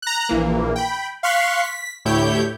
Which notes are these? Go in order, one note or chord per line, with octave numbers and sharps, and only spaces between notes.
A#5 F#6
A#1 E3 A#3
G5 B5
F5 C6 C#6 F#6 B6
B6
D2 A2 E4 G4 C#5 G6